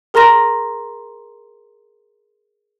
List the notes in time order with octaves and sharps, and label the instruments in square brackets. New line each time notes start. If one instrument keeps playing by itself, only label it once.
[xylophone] G#4 A#4 A#5 C6 A#6 E7